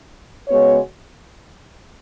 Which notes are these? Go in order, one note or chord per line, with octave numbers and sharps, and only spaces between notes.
C#3 G#3 B3 F#4 C#5